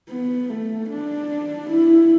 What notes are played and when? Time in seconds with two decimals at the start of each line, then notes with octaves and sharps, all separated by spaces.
0.09 B3
0.50 A3
0.90 D4
1.71 E4